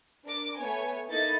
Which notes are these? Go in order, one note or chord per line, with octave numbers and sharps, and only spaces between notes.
D4 A#4 D6
A3 B3 C#5 G#5
A#3 D#4 E4 A4 A6